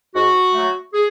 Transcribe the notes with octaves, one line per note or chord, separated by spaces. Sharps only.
G#2 F#4
F#3 A3
G#4